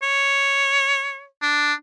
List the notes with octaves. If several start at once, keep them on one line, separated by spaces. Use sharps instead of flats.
C#5
D4